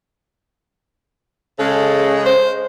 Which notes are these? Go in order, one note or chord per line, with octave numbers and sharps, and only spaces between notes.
C#3 G#3 A4
C5